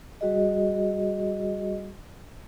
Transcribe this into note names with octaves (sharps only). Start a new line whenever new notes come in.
G3 F#4 G#4 D#5